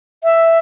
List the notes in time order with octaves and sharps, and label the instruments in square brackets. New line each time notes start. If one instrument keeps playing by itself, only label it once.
[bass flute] E5